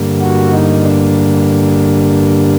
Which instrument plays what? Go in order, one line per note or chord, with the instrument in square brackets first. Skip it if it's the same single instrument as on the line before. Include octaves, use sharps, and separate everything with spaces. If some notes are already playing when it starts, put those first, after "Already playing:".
Already playing: [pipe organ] G2 D3 G3 A#3
F#4
D#4
D4